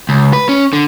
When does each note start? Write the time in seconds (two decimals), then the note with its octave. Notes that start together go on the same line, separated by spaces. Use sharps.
0.09 C#2
0.33 B4
0.49 C#4
0.73 D3